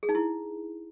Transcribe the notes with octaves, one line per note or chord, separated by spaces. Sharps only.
G#4
D#4
E4